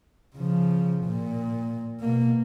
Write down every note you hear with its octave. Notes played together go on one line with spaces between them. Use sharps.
C#3 F3
A#2
B2 A#3